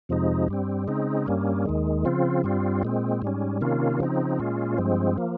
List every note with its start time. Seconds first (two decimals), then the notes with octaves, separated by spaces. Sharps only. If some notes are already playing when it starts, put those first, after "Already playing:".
0.09 F2 C3 F3 G#3 D#4
0.48 G2 G3 C4
0.88 C#3 G#3 C4 D#4
1.26 G2 G3 A#3 C#4
1.66 D#2 D#3 G#3
2.05 C#3 F3 C4 F4
2.44 G2 G3 C4 F4
2.83 A#2 G#3 C4
3.22 G#2 G3 C#4
3.61 C3 D#3 A#3 C#4 F4
4.00 C#3 F3 C4 D#4
4.39 A#2 G#3 C#4 F4
4.78 G2 F3 G#3 C4
5.18 F3 A#3